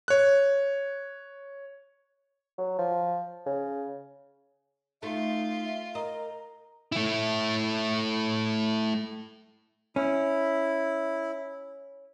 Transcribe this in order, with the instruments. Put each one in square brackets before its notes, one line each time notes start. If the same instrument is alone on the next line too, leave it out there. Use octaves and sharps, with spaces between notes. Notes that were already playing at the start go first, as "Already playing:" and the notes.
[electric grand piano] C#5 F#6
[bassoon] F#3
F3
C#3
[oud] A3 [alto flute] D#4 [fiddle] F4 [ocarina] E5
[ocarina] A#4 [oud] D#5 [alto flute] A#5
[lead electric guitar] A3 E4
[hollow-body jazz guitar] C#4 [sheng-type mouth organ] E4